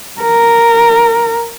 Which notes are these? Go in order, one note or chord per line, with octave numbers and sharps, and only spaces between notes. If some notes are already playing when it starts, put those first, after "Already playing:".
A#4